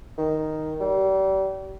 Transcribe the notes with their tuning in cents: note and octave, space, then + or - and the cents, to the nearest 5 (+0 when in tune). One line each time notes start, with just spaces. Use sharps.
D#3 +0
G3 -35